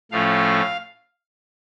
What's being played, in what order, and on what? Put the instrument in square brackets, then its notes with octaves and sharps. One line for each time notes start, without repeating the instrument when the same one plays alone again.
[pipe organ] A2 F3 A3 C#4 F5